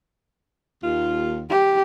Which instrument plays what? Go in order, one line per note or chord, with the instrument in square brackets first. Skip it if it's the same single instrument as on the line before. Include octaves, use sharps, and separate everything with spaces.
[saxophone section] D#2 F4
[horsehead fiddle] G4